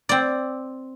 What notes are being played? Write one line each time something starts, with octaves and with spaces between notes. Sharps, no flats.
C4 D5